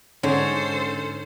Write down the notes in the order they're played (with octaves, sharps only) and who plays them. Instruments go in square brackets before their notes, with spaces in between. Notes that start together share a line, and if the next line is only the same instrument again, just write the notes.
[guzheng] G#2 [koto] D3 [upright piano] C#4 [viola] A4 C5